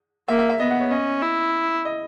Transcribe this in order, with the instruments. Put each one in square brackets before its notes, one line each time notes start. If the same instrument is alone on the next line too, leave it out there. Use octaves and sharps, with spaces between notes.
[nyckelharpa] A#3 [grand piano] E5
[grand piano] E5
E5
[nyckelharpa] B3 [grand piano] D#5
[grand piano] F#5
C#5
[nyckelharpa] C#4 [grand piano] D#5
[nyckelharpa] E4
[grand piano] D#5